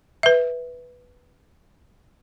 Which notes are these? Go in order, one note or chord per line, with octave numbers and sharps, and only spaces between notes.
B4 E5